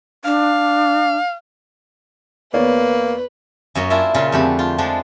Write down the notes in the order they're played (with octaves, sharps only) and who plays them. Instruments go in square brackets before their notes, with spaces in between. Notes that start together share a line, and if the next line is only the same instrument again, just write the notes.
[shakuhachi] D4 [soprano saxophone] F5
[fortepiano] E2 C#5 D5 [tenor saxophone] A#3 [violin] B4
[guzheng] F#2 A#3 C#5 D#5
D4 E4 F4 E5
A#2 C#3 F4
F2 D3 A3 G4 B5
F4
F3 G#3 D4